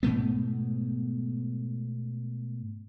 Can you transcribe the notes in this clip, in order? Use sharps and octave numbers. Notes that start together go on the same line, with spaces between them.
G#2 B2 A3 B3